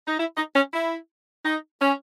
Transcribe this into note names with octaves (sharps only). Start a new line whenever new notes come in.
D#4
E4
D#4
C#4
E4
D#4
C#4